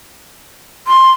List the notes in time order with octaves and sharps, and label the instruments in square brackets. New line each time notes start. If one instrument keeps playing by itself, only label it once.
[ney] C6